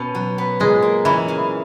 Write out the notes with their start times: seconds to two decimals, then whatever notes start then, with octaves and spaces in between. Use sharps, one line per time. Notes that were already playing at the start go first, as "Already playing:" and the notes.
Already playing: B2 C#4
0.15 F#3
0.38 B3
0.60 A#2 G#3
0.82 A#3
1.05 E3 C#4
1.28 C#3